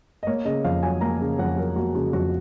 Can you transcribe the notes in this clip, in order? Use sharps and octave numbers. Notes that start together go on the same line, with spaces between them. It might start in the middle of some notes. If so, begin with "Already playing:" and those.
D#5
A#3 C#5
C#3 D#5
F2 F5
F#3 G#5
A#3 A#5
C#3
F2 F#5
F#3 A#4
A#3 F#4
C#3 F#4
F2 F#4